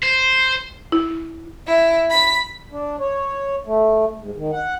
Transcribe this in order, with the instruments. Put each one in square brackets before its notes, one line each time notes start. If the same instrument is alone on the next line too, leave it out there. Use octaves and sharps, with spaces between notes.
[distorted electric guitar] C5
[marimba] E4
[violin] E4
B5 B6
[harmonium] D4
C#5
A3
G#2
D#3
F#5